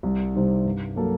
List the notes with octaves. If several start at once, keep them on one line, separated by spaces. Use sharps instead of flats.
C2
C3 G3 C4 D#4
G2
F#3 A#3 F#4 A4